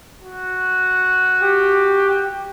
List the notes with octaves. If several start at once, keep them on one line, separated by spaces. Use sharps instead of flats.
F#4
G4